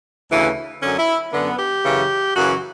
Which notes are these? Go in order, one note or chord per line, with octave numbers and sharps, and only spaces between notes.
D2 C#3 E3
F#2 D3 C#4
E4
F#2 D3 B3
G4
F#2 C#3 E3
F#2 C#3 E3 F#4